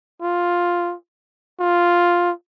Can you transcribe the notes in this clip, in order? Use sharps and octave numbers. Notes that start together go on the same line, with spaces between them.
F4
F4